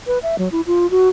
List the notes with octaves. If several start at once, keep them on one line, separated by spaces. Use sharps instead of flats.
B4
E5
F#3
E4
F4
F#4